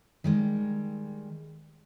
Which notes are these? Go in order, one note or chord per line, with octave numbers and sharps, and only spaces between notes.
D#3 G3 G#3